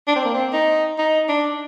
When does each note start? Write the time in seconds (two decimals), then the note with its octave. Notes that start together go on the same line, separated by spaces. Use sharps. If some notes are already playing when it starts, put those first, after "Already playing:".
0.07 D4
0.16 C4
0.25 A#3
0.34 C4
0.53 D#4
0.98 D#4
1.29 D4